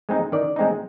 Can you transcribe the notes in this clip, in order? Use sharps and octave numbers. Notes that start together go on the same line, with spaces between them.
G#3 C4 D#4
D#3 D5
G#3 C4 D#4